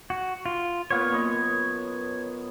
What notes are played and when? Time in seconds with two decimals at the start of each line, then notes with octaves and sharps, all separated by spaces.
0.10 F#4
0.46 F4
0.91 A#2 B3 C#5 F5
1.12 F#2 B4 D#5